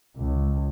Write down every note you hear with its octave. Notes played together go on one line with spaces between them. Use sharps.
C#2